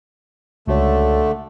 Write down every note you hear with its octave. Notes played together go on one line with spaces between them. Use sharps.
C#2 D3 A3 F#4 C#5